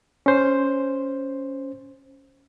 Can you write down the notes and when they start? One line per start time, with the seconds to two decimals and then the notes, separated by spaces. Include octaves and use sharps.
0.26 C#4 C5